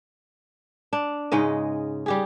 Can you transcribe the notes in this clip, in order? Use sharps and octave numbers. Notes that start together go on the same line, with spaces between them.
D4
G#2 C#3 G#3 D#5
G3 G4 G#4